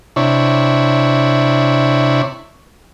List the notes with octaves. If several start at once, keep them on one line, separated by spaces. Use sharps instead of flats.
C3 D4 E4 C#5